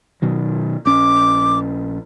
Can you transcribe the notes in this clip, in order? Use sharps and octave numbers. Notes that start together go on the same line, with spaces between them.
B2 D#3 F#3
A#1 C#4 D6